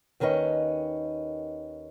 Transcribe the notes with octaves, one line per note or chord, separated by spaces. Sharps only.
D#2 D#3 C#4 B4 D#5